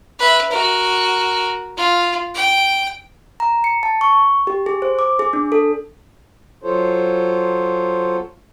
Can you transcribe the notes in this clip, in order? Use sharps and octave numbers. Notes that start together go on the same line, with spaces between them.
B4 E5
F#4 A#4
F4
G5
A#5
C#7
A5
C#6
G4
G#4
C5
D6
G#4
D4
A4
F#3 F4 A4 C5 C#5